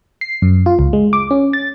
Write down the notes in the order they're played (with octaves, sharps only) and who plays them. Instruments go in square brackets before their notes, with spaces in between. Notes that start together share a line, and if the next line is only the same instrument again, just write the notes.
[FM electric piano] C7
F#2
F4
C#2
G#3
D6
C#4
A6